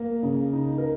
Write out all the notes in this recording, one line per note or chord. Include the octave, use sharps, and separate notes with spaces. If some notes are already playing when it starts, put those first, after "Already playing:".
Already playing: A#3
C#3
D#4
A#4